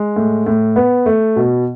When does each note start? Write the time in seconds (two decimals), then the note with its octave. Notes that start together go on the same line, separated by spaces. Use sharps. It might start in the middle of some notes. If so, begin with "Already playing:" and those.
Already playing: G#3
0.16 A2
0.46 A2
0.76 B3
1.06 A3
1.36 B2